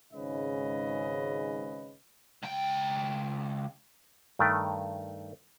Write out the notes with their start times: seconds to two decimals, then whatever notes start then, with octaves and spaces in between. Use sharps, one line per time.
0.13 G#1 G#2 C#3 C#4 B4 D#5
2.43 C#2 G5
4.39 G2 D#3 A3 G5